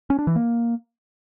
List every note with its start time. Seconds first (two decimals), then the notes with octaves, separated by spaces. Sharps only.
0.10 C#4
0.19 D4
0.27 E3
0.36 A#3